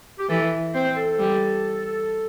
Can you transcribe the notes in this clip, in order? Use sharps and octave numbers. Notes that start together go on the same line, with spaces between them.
G4
E3 A4
C4 C5
A4
G3